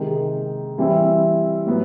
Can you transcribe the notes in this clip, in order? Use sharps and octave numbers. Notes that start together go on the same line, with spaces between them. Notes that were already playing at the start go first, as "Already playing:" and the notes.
Already playing: C3 D#3 G#3
E3 G3 C4 E4
A2 F#3 B3